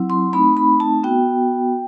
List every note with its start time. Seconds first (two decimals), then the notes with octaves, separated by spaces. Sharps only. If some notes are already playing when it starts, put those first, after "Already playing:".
Already playing: F#3 C4 E4
0.10 C6
0.33 A3 C4 D#4 B5
0.57 B5
0.80 A5
1.03 B3 F#4 G5